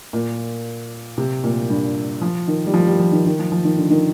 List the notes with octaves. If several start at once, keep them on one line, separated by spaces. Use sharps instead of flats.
A#2
C3
A#2
G2
F3
D#3
G3
F3
G3
F3
D#3
D#3
F3
F3
D#3
D3
D#3